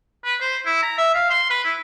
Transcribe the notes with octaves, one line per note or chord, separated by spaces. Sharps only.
B4
C5
E4
A#5
E5
F5
C6
B4
E4